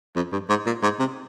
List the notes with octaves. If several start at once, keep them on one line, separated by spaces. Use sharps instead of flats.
F2
G2
G#2
A#2
G#2
C3